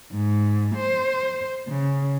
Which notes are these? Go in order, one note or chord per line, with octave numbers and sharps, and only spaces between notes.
G#2
C5
C#3